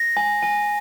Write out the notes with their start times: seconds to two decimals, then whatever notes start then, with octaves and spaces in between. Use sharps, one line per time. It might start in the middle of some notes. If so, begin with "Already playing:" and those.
Already playing: A#6
0.17 G#5
0.43 G#5